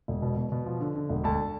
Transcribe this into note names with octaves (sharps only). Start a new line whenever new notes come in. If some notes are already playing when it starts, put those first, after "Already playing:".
E1
B2
B2
B2
F3
D3
D3
E1
D2 A5